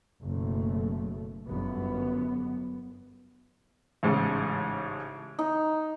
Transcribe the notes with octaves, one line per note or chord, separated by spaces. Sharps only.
F#1 B2 A3
G1 F#2 B3
A1 G#2 C#3
D#4